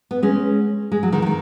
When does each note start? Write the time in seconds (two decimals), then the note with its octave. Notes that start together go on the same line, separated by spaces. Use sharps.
0.11 B3
0.23 G#3 C#4
0.92 G#3
1.03 F#3
1.12 D#3 G#3
1.22 F#3
1.26 D#3